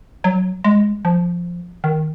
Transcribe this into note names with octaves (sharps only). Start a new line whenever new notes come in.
F#3
G#3
F3
D#3